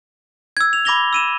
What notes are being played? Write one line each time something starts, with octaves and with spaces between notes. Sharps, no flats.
E6 G#6
F7
B5 D6 G#6 A#6 F7 G7
E6 D#7 E7